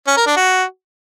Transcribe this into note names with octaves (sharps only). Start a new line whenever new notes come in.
C#4
A#4
D4
F#4